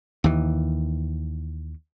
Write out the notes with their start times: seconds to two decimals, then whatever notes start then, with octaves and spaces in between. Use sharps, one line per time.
0.24 D#2 E3